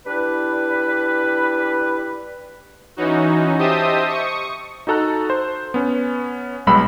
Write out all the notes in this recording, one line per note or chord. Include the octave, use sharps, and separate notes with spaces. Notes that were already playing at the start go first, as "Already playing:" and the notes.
G3 D4 E4 B4
E3 C#4 D#4 F#4
G4 C5 D#5 E5 A5 D#6
C#6 D#6 C#7
D#4 F#4 A4 A#5 F#6
C5
B3 C#4
B1 G3 G#3 B3 B5 E6